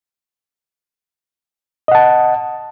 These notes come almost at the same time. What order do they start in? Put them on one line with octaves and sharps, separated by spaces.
D#5 F#5 A5